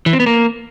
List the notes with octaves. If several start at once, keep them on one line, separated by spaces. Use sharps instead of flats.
E3
C4
B3
A#3